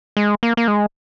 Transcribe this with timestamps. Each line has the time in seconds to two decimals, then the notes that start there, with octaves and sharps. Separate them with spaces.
0.17 G#3
0.43 A#3
0.57 A#3
0.68 G#3